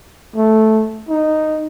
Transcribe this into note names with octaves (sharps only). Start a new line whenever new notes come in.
A3
D#4